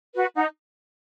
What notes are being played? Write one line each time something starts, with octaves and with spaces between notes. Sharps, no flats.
F#4 B4
D#4 F#5